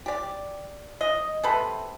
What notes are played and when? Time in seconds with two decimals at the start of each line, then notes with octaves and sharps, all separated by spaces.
0.06 G4 D5
1.01 D#5
1.43 C3 A4 B4